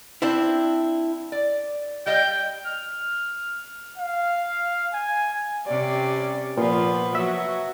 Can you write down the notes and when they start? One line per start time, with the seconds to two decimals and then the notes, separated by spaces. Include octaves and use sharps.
0.22 C4 D4 E4
1.32 D5
2.06 G3 D#5 F5 G5
2.65 F6
3.98 F5
4.93 G#5
5.66 C3 G3 C#4 D5
6.57 A#2 F3 A#3 B3 B4
7.15 F#3 F#4 E5